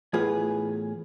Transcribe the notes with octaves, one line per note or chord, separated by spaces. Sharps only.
E2 A2 F4 G#4 B4